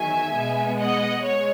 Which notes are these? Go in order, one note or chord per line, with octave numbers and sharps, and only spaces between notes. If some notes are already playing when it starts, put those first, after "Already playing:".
Already playing: E2 D#3 F#3 E5 G#5
B2 G#3 B3
D#5 F#5
G#3 C#5